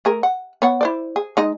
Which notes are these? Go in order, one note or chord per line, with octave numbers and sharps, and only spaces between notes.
A3 G#4 A#4
F#5
B3 C#5 F#5
E4 C5 D5
G#4
G#3 D#4 D#5